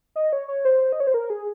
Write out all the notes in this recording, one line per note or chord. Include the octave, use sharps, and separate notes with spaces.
D#5
C#5
C#5
C5
D#5
C#5
C5
A#4
G#4